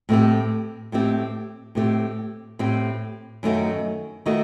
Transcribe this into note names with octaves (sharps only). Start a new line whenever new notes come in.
A2 A3 C4 G4
A2 A3 C4 G4
A2 A3 C4 G4
A2 A3 C4 G4
F#2 D#3 A3 D#4 F#4
D#3 A3 D#4 F#4